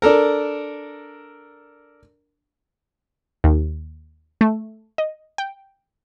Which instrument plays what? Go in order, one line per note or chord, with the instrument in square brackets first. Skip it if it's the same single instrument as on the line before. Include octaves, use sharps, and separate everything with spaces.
[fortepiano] D4 A4 A#4
[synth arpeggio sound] D#2
A3
D#5
G5